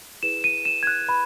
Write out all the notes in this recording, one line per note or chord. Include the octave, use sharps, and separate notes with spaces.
E4 G#4 B4 E7
D#7
E7
G#6
F#6
B4 B5